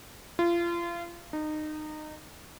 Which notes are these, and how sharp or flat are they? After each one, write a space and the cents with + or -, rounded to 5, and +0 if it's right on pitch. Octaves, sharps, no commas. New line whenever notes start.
F4 -30
D#4 -25